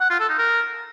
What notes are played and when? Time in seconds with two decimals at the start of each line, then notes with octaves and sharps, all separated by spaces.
0.01 F#5
0.10 F4
0.20 A4
0.29 D#4
0.38 A#4